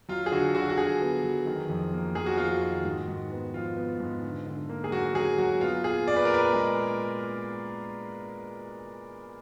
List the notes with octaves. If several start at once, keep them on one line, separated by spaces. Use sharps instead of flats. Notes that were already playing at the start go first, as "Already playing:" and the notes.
F#3 F4
G#4
D3 F#4
D3 F#4
F#4
D3 G#4
B3
F#3
D#3
F2
A#3
F2 G#4
F#4
F2 F4
F#4
D#3
G#2
G#2
B3
F3 F4
B3
G#2
D3
D3
A#3
G#4
F#3 F#4
F#3 G#4
F#3 F#4
B3 F4
A#2 G#4
A#2 D5
B4
A#4
A#2 B4
G#3
A#2